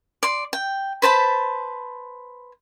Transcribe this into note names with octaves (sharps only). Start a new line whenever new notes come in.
D5 C6
G5
B4 C5 A5 B5